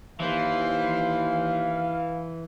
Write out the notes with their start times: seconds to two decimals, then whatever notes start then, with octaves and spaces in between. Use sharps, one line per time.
0.20 D#2 E3 C5 F5